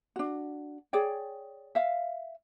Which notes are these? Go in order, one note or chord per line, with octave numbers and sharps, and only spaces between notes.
D4 F#4
G#4 C#5 D5 G5
E5 F5